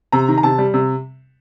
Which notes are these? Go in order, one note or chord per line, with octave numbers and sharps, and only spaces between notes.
C3 A#5
D#3
A#5
C3 A5
G3
C3